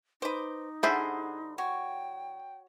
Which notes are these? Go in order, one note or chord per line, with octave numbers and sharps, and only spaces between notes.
D#4 B4 C5 D6
D3 G3 E4 G#4 C5 E5 F#5
F#4 C#5 G5